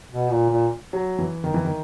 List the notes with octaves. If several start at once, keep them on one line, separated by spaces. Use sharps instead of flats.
B2
A#2
A#2
F#3
E3
D#3
E3
D#3